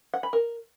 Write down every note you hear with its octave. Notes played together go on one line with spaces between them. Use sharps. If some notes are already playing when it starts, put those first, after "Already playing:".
F#5
B5
A#4